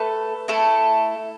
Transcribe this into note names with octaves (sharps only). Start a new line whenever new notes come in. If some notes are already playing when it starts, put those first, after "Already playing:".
Already playing: A3 A4 B4
A3 E4 A4